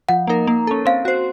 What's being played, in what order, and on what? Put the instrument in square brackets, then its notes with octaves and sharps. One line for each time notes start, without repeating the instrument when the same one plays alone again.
[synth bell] F3 [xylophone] F#5
[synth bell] A#3 D#4 A#4
A#3
C#4 A4
[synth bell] C4 [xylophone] F5
[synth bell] F#4 C5